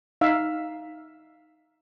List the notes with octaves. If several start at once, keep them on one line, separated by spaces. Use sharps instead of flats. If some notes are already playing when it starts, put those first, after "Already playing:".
D#4 E5 F5